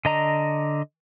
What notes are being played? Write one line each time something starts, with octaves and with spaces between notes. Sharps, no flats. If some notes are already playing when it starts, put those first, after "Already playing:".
D3 D#5 A#5